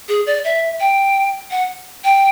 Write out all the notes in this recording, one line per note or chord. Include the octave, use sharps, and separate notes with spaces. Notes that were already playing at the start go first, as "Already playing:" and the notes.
G#4
D5
E5
G5
F#5
G5